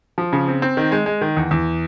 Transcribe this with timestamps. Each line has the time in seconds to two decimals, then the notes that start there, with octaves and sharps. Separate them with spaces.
0.18 F3
0.33 C#3
0.48 C4
0.62 C4
0.77 D#3
0.92 G#3
1.06 G#3
1.21 D#3
1.37 E2
1.51 E2